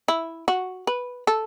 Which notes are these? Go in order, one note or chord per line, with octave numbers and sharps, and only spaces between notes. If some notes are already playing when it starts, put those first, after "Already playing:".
E4
F#4
B4
A4